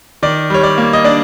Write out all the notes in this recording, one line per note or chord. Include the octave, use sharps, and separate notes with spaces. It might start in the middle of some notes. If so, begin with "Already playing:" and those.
D#3 D5
G3 C#5
D5
A#3
D#5
D4 D5